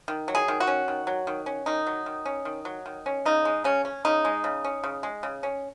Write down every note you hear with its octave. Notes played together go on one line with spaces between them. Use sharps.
D#3
F#3
G#4
D#3
F#4
C#4
D#3
F#3
D#3
C#4
D#3 D#4
F#3
D#3
C#4
D#3
F#3
D#3
C#4
C#3 D#4
G#3
C#3 C#4
C#4
C#3 D#4
G#3
C#3
C#4
C#3
G#3
C#3
C#4